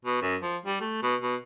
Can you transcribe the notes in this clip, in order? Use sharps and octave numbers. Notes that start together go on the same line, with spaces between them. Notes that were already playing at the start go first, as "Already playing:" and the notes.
B2
F#2
F3
G3
A3
B2
B2